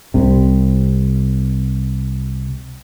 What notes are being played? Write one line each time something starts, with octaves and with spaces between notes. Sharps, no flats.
C2 C3